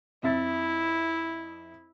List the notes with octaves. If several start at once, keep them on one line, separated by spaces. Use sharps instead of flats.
F2 E4 E5 A6